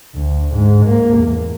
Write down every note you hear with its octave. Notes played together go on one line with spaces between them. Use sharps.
D2
G#2
A#3
E2